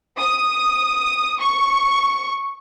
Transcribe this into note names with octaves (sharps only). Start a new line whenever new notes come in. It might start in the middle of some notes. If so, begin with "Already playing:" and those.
D#6
C#6